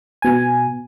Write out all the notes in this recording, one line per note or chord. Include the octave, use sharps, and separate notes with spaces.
B2 G#5